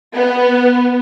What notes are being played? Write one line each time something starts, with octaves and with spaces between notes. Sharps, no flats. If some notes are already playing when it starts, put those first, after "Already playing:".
B3